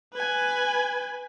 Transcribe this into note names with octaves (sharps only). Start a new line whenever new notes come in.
B4 G#5